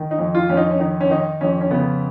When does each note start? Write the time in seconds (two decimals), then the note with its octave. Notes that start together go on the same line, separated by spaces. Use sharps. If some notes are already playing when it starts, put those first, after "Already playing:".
Already playing: D#3
0.11 D#4
0.19 F2
0.35 F4
0.49 F2 C#4
0.57 D#4
0.71 C#4
0.80 D#3 D#4
1.01 C#4
1.10 D#3 D#4
1.41 F2 C#4
1.61 C#4
1.71 C#3 B3